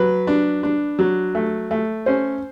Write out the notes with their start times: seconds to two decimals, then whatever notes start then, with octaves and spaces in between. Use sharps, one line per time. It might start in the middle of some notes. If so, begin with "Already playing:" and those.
Already playing: F#3 B4
0.27 D4
0.63 D4
0.99 F#3
1.35 A3
1.71 A3
2.06 C#4 C5